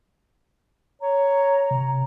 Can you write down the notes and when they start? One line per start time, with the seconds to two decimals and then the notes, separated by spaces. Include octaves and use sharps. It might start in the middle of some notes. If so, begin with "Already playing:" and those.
1.02 C#5 A#5
1.71 C3